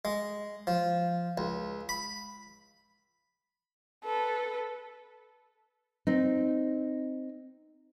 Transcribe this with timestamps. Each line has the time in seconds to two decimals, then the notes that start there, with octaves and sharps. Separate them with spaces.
0.05 G#3
0.67 F3
1.38 C#2
1.89 B5
4.04 A4 B4
6.07 C4 D#4